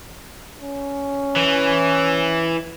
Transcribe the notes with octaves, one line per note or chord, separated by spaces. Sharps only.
C#4
E3